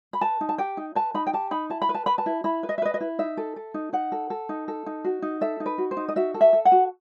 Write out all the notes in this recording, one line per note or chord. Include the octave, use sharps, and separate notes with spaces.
B5
B4 A5
D#4
A5
G4 G5
D#4
B4 A5
D#4 B5
G5
G4 A5
D#4 B5
E4 A5
B5
B4
A5
B4 B5
A5
E4
E4 B5
B4
D#5
E5
B4 D#5
D#5
E4
D#4 E5
A4
A4
D#4
D#4 F#5
A4
A4
D#4
A4
D#4
F#4
D#4
A4 E5
D#4
B4
F#4
C5
D#4
D#5
F#4 E5
A4
E5
A4
F#5
F#4